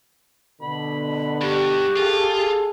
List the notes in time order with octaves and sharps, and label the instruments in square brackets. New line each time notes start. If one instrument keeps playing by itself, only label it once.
[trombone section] B2 D3 [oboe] B5
[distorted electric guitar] G2 [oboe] F#4 [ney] G4
[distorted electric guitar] F4 [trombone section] G#4 A4